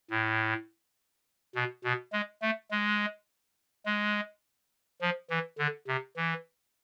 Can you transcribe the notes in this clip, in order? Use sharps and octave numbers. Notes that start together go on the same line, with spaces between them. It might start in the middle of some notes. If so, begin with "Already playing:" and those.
A2
B2
B2
G#3
A3
G#3
G#3
F3
E3
D3
C3
E3